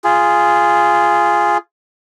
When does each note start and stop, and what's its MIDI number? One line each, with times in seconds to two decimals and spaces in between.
0.04 1.58 65
0.04 1.58 68